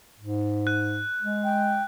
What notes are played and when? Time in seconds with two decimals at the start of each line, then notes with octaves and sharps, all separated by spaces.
0.19 G#2
0.67 F#6
1.22 G#3
1.44 G5